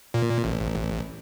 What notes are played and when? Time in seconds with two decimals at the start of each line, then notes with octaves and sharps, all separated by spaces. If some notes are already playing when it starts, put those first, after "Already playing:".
0.14 A#2
0.44 A1